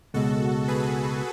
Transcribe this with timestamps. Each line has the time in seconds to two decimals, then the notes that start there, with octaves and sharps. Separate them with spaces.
0.14 C#2 B2 G#3 F#4 A4
0.68 G#4 B4